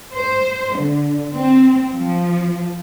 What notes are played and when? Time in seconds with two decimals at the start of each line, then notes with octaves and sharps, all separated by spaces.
0.14 C5
0.77 D3
1.35 C4
1.92 F3